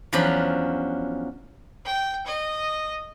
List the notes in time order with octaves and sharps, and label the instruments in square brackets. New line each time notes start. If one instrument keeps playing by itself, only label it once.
[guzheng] E2 F3 F#3 C#4 D4 B5
[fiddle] G5
D#5